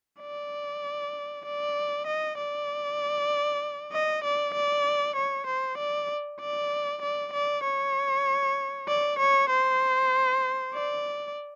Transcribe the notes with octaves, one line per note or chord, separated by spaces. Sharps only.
D5
D5
D#5
D5
D#5
D5
D5
C#5
C5
D5
D5
D5
D5
C#5
D5
C#5
C5
D5